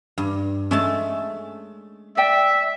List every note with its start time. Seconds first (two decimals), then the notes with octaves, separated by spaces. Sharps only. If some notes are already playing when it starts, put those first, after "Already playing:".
0.18 G2
0.71 G#3 A3 C#4 A5
2.17 D5 E5 G5